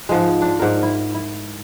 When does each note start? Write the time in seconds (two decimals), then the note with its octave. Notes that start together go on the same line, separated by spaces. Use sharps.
0.09 G#2 F3 G#3
0.42 D4
0.60 G#2 A#4
0.83 E4
1.15 E4